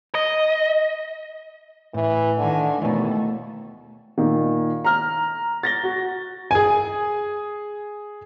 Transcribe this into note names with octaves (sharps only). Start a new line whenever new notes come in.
D#5
A2 E3
D3 D#3 G#5
D#2 B2 E3 A3
A#2 D#3
A#5 F6
A6 A#6 G7
F#4
G#4 G#5